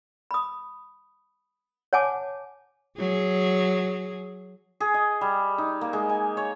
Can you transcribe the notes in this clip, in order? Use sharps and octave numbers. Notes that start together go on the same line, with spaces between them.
B5 D#6
C#5 F#5 G#5 A5 D6
F#3 G#4
G#4
D#5
G3
D#4
A#3
G#3
G#5
C#5